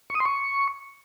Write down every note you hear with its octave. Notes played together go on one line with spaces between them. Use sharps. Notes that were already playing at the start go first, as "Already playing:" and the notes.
C#6
D#6
C6
C#6